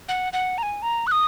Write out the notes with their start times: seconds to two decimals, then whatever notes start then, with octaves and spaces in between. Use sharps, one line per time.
0.09 F#5
0.33 F#5
0.58 A#5
0.63 G#5
0.82 A#5
1.07 F#6
1.12 D#6